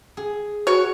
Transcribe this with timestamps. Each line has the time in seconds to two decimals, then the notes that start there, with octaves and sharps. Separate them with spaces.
0.17 G#4
0.67 F#4 C#5